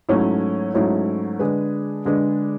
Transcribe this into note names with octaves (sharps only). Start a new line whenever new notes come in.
G#2 F#3 A3 C#4 E4
G#2 F#3 A3 C#4 E4
D3 G#3 D4 G#4 B4
D3 G#3 D4 G#4 B4